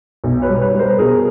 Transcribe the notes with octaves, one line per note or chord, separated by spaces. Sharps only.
B1
B4 C#5
G3
B4 C#5
G3
A#4 C5
B2 G#4 A#4